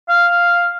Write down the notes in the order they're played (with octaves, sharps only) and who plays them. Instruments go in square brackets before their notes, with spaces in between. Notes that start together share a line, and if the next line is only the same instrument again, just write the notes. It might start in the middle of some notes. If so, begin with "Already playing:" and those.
[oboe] F5